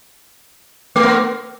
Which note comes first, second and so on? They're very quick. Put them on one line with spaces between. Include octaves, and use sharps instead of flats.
A3 A#4 B3